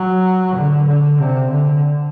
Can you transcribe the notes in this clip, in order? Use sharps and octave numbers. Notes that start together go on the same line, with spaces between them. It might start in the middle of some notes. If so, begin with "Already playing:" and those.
Already playing: F#3
D3
D3
C3
D3